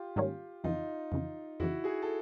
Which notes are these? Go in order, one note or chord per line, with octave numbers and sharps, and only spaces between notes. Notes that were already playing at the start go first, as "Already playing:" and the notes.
Already playing: F4 G4
G#2 D#3 G3 A#3 C#4
F2 C#3 E3 D#4 F4
F2 C#3 E3
F2 C#3 E3 E4 F#4
F#4 G#4
A4